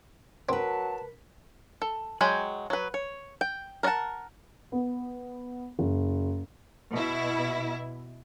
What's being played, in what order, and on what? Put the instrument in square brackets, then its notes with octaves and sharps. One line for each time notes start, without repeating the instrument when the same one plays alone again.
[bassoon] F#3 [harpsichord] C4 [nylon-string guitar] A#4 B4 [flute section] A5
[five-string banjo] A4
F#3 G#3 G5 G#5 B5
F#3 B4
C#5
G5
A#4 D5 D#5 F#5 A5
[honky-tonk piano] B3
F#1
[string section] B2 E4